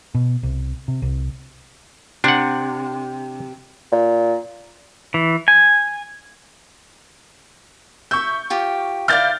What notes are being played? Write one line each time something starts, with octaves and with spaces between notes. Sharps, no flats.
B2
C2
C3
C2
C3 D4 F#5
A#2
E3
G#5
E5 C#6 G6
F4 G4
E4 D5 F5 F6 G6 A6